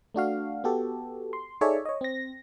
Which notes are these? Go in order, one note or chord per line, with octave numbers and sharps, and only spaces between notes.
A3 D4 F#4 F5
B3 F#4 G4 A4
C6
D#4 G#4 A4 C#5 D5 E5
C#5 D#5
C4 A#6